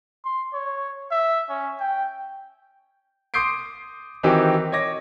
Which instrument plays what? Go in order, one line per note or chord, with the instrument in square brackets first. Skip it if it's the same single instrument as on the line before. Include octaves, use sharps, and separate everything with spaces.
[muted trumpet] C6
C#5
E5
C#4
G5
[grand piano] C6 D6 D#6 G6 C7 D7
D#3 E3 C4 D#4 F#4 G4
C#5 D#5 D6 A#6